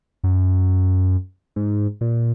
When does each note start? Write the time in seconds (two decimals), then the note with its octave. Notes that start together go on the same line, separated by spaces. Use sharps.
0.24 F#2
1.56 G#2
2.01 A#2